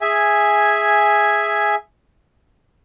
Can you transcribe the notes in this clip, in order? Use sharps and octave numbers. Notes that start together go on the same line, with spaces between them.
G#4 E5 G#5